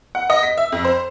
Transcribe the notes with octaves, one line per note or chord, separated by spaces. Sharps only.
F#5
D#5
B6
E5
F2
C5